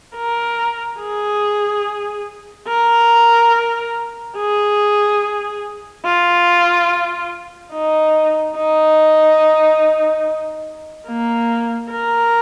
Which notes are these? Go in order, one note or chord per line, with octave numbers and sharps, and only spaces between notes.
A#4
G#4
A#4
G#4
F4
D#4
D#4
A#3
A#4